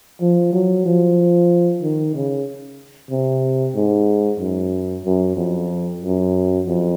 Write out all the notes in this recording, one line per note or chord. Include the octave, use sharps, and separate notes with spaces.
F3
F#3
F3
D#3
C#3
C3
G#2
F#2
F#2
F2
F#2
F2